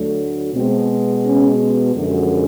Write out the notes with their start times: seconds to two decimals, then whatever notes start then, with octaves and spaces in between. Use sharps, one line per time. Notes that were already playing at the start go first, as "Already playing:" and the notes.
Already playing: D2 D3 F#3 A3
0.54 B2 G#3 C4
1.24 C#4
1.95 F#2 D3 F3 G#3 D4